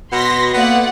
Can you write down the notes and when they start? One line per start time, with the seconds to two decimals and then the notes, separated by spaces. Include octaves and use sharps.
0.12 B2 F#4 B4 C#5 C6 A#6 B6
0.54 A#3 B3 A4 D5 E5 F#5 G5